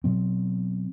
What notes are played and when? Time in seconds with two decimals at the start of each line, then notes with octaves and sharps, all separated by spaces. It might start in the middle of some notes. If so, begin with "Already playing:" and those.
0.04 B2 F#3 C4